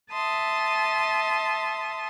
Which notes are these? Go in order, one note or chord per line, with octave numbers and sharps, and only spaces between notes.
E5 A5 C6 D#6